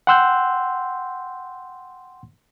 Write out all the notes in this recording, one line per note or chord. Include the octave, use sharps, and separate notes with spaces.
F#5 G5 C6 E6 F#6 G6